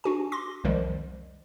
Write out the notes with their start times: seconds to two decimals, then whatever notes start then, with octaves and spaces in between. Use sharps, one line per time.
0.04 D4 F#4 G#5
0.32 C6 D6 A#6
0.64 C2 F2 D#3 F3 G3 G#3